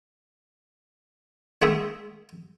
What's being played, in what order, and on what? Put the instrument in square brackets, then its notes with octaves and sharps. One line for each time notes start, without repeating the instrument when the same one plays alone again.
[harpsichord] D#3 G#3 A3 G#4 E5